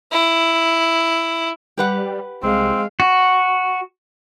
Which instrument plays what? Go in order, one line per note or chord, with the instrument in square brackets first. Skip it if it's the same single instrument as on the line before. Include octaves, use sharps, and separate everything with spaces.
[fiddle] E4
[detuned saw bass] G3 [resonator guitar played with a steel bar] G4 B4 F#5
[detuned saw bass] C2 [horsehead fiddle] G#3 F5 [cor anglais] C4
[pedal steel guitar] F#4